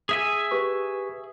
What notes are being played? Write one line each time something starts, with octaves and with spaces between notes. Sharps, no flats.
G#4 E5 G#5
G4 B4 C#6